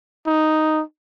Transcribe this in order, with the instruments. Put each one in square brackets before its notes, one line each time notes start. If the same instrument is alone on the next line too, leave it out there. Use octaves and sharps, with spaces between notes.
[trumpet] D#4